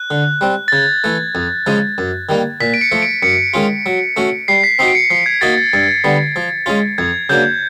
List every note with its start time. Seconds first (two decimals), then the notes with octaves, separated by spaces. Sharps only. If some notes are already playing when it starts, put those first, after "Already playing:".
Already playing: F#6
0.11 D3
0.41 G3 C4
0.68 A6
0.72 C#3 G#6
1.04 E3 A3
1.35 F2
1.66 C#3 F3 G#3 C#4
1.98 F#2
2.29 D#3 G3 A#3
2.61 A#2 B6
2.74 D7
2.81 C#7
2.92 F3 A3
3.02 D7
3.23 F#2 C#7
3.54 D#3 G#3 C#4 F4
3.86 F#3
4.16 A3 C#4 F#4
4.48 G3 C7
4.64 B6
4.79 C4 D#4 F#4 C7
4.88 D7
4.95 C#7
5.10 F3 C7
5.26 G#6
5.41 A#3 D#4 F#4 A6
5.57 A6
5.73 G2 A6
6.04 D3 G3 B3
6.36 F3
6.66 G#3 C#4 F4
6.98 F2 G#6
7.29 C#3 F#3 A#3 D4 G6